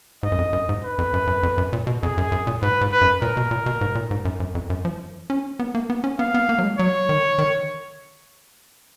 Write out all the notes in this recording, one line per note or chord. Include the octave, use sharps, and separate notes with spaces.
G#2 D#5
F#2
F2
F#2
G#2
B4
F2
F#2
F#2
F2
F#2
A#2
B2
F2 G#4
F#2
F#2
A#2
G#2 B4
G#2
B4
F#2
A#2 A#4
B2
A#2
B2
G#2
A#2
G#2
F#2
F#2
F2
F#2
F3
C#4
B3
A#3
B3
C#4
B3 F5
B3
A#3
F#3
G#3
F#3 C#5
D#3
D#3